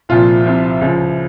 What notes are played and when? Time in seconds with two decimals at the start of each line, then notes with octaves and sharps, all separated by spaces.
0.09 C2 A#2 F3 F4
0.45 C2 C3 F3
0.81 C#2 C#3 F3